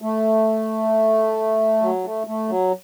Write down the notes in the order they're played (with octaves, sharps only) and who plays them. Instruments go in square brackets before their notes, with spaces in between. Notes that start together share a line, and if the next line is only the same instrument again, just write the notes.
[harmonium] A3
F#3
A3
A3
F#3